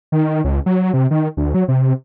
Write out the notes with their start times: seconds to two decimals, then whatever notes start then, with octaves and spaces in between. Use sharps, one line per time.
0.12 D#3
0.44 C#2
0.66 F#3
0.94 C3
1.11 D#3
1.37 D2
1.54 F#3
1.68 C3